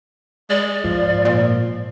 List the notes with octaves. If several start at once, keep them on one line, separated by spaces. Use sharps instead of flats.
G#3 D5
G#2 F3
A#2